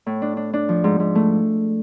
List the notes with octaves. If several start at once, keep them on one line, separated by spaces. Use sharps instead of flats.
A2
D4
D4
D4
F3
G#2
G#2
A3